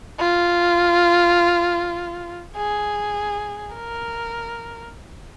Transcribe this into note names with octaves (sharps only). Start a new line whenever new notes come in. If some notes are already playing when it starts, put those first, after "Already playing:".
F4
G#4
A#4